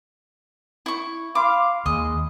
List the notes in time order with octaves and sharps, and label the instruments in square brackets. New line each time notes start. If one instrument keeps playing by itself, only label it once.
[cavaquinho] E4 C#6
[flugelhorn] F5 [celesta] B5 C6 [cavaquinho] D6
[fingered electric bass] D#2 [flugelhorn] G#3 [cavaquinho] D#5